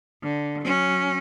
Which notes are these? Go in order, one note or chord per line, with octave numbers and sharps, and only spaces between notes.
D3
F#3 C#4